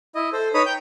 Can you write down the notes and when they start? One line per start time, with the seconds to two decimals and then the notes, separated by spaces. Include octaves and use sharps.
0.15 E4 D#5
0.33 A4 C5
0.54 D#4 B4 C#5 B5 D#6
0.66 G5 G6